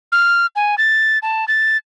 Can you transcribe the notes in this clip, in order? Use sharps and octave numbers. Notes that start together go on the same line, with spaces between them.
F6
G#5
A6
A5
A6